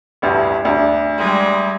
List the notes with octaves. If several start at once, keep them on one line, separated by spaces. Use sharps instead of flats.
A1 D2 G2
D2 D4
G3 G#3